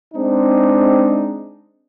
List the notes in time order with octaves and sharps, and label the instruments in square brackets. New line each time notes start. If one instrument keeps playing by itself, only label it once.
[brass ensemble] G#3 C4 D4 D#4